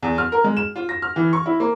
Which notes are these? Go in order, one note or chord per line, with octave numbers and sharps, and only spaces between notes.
E2
F6
A#4
G#3
E7
F4
A#6
F6
E3
C#6
E4
A#3